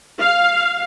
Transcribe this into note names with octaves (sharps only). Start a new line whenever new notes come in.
F5